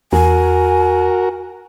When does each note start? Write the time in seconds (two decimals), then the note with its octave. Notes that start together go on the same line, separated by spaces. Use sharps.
0.13 E2 F#4 A#4 G#5